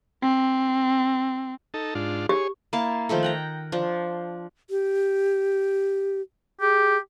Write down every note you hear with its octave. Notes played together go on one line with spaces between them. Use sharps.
C4
D#4 A4
G#2 D4 F4
G4 G#4 C#5
A#3 E4 F5 A5
D#3 F3 A3 A4
F#5 G5 A#5
F3 D4
G4
G4 G#4